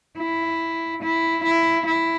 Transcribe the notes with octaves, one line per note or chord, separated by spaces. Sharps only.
E4
E4
E4
E4